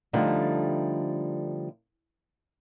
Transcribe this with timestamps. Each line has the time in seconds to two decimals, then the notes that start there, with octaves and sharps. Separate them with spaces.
0.13 D3 F3 G3 A3 D#4